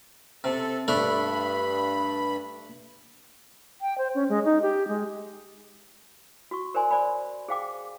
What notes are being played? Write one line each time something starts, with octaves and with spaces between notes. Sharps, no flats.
C3 A4
G2 A3 D4 A4 B5
G5
C5
C#4
G#3
D#4
G4
G#3
F#4 C#6
A#4 C5 D5 G#5 C6
C5 D5 G#5 B5
G#4 C5 F5 G5 D6